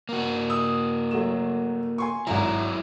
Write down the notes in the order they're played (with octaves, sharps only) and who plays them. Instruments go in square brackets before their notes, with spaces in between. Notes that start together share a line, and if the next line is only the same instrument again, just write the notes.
[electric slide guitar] A#3 F#4
[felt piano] D#6 E6
F#3 A3 E7
G#5 C6 C#6
[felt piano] G#1 A#5 [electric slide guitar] F#3 E4